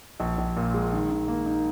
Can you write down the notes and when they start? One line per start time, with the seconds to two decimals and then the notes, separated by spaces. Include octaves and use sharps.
0.20 A#1
0.38 A#1
0.57 A#2
0.74 G#3
0.93 D#3
1.10 D#3
1.28 A#3
1.46 D#4